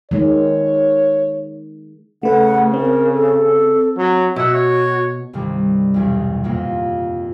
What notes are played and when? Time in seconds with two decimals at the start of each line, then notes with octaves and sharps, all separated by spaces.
0.11 D#3 G#3 C#5
2.23 C#3 A3 B4 F#5
2.74 C4 A#4
3.14 A4
3.97 F#3
4.36 B2 F#4 E5 F#5
4.54 C#5
5.33 C2 G2 D#3 G3
5.94 B1 E2 B2
6.44 F2 A#2 A#3